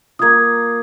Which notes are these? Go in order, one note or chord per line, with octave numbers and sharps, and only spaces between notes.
A#3 F4 D#6 G#6